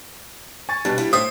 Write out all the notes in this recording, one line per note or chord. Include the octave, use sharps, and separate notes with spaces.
G#5 C#6 A6
B2 G3 D4
E4
A2 C5 E5 D#6